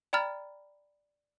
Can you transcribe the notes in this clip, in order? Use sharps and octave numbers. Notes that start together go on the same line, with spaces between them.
D5 G5 A#5 B5 F6 A6